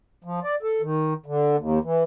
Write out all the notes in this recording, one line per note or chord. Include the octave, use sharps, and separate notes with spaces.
F3
D5
A4
D#3
D3
D#2
E3